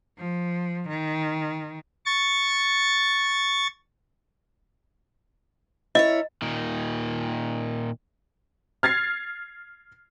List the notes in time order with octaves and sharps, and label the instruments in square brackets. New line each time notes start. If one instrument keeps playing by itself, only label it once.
[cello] F3
D#3
[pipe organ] C#6 A6
[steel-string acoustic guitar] E4 A#4 C#5 [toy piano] D#5
[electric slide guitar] A#2 D#3
[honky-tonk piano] F6 G#6 A6 C7